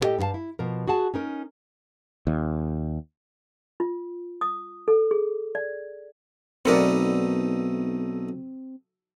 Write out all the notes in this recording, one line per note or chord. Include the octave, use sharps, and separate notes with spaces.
A2 B3 G4 A4 D#5 G5
G2 D#4 F#4 F5 A5
E4
B2 F3 A#4
F#4 G#4 F#5 A5
C#4 D#4 A#4
D#2
F4
D#6
A4
G#4
D5
B1 A3 B3 C4 D#4 A#4 D5